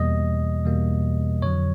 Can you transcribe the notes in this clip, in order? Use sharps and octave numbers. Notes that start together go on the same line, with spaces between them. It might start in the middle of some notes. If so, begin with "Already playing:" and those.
Already playing: E2 B2 G3 A#3 D#5
E2 B2 G3 A#3
F2 D3 F#3 C#5